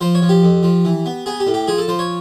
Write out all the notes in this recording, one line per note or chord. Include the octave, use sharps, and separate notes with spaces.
F3 C5
C#5
F3
G4
F2
F3
E3
B3
B3 G#4
G4
A2
G4
F3 G#4
A4
F3 C5
C#5